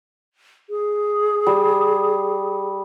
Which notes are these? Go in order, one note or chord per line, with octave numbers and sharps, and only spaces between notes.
G#4
G3